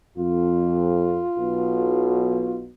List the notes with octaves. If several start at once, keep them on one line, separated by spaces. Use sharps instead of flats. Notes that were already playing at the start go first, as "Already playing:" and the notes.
F2 F4
B1 B2